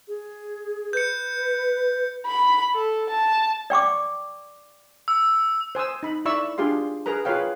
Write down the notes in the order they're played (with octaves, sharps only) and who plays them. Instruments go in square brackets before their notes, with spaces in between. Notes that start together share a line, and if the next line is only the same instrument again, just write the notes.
[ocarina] G#4
[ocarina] B4 [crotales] G6 C#7
[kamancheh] B5
A4
A5
[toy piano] D5 G5 C#6 D6
[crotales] E6
[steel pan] C5 G#5 D#6 E6
D#4 B5
E4 D5 E5 B5 C#6 E6
D4 F4 G4 G#4 F5 C6
G#4 A#4 B4 A#5
F4 G#4 B4 C#5 F5 G5